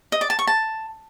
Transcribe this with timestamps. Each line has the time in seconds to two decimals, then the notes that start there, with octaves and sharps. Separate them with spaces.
0.12 D#5
0.21 D5
0.30 A5
0.39 C#6
0.47 A5